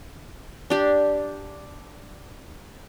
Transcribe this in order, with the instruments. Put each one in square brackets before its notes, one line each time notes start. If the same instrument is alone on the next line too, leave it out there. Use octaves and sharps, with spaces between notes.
[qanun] D4 G4